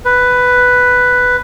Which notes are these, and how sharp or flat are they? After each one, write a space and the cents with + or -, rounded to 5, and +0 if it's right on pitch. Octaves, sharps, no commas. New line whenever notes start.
B4 +5